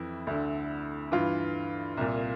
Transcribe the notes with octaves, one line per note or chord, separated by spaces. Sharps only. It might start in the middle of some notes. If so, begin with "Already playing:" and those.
Already playing: F2 E3 E4
D2 D3
G2 E3 F4
C2 A#2